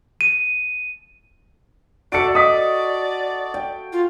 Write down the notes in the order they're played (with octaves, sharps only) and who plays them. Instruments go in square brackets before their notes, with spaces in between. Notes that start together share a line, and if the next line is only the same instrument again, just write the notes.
[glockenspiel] D#7
[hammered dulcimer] F#4 A4 E5 [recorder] D5 [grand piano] C#7 D7
[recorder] D5 [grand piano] D#5 D#6 B6
[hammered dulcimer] G5
[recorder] F4